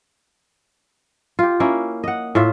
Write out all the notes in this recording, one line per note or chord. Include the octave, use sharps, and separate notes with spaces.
F4 G4
A#3 C#4 E4
D#5 F#5
A2 F4 E5